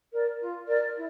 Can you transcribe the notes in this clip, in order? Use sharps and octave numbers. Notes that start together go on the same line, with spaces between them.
A#4 D5
F4
A#4 D5
E4